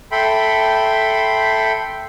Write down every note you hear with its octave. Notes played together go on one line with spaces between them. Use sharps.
A4 E5 G5 B5 C6